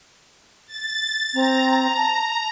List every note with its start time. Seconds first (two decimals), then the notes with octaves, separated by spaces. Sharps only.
0.66 A6
1.34 C4 A#5
1.97 A5